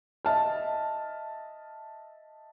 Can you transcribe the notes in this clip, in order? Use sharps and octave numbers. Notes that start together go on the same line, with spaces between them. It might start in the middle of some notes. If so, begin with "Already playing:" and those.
D#5 E5 A5 F6